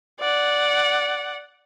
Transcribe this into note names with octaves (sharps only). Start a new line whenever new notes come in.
D5 F#5